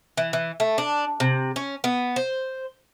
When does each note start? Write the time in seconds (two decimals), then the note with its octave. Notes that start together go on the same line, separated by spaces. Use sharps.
0.17 E3
0.33 E3
0.60 A3
0.78 D4
1.20 C3
1.56 C#4
1.84 B3
2.16 C5